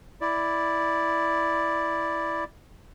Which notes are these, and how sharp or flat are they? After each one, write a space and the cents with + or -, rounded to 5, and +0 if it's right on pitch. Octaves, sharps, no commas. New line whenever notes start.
E4 +0 D5 +0